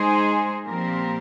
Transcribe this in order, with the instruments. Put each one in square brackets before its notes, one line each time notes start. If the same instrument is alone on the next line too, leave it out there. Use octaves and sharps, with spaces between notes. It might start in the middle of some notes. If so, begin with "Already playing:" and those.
Already playing: [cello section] G#3 D#4 G#4 C5
A#2 F3 C4 G4 A#4